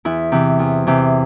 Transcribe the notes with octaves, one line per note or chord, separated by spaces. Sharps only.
E2 E4
C3 E3
E2
C3 E3